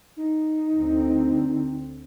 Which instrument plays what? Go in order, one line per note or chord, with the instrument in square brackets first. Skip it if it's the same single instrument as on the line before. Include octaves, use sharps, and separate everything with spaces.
[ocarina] D#4
[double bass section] D2 D3 C4